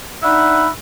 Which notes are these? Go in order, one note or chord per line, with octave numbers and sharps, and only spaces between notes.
D4 D#4 E5 F#5 B5